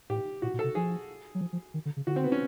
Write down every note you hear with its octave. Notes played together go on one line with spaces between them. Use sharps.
A2 G4
A#2 F#4
A#2
A4
C3
F3 G#4
F#3
F3
F3
D#3
D3
C#3
D3 F#4
C4
B3
C#4